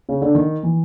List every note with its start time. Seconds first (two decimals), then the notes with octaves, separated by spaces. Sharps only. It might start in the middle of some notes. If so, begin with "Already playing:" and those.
0.09 C#3
0.22 D3
0.35 D#3
0.63 E3